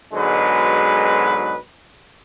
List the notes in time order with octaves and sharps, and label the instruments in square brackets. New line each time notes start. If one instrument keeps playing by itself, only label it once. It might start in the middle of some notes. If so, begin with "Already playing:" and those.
[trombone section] G#2 B2 D3 F#3 G#3 B4